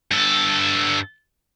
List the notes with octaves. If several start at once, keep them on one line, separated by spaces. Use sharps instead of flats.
G2 A4